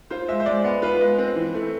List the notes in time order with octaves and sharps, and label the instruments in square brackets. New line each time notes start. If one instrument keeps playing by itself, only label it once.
[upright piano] F4 [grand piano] C5
[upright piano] G#3 [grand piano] E5
[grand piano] C5
[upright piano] G#3 [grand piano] D5
[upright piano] B3
[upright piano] F4 [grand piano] B4
[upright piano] G#3
C4
E3
A3